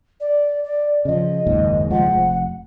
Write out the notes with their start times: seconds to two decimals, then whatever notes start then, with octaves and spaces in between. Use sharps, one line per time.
0.20 D5
0.64 D5
1.05 C#3 F3 D#5
1.47 F#1 D#2 G#2
1.90 C#2 F3 G#3 F#5
2.13 F1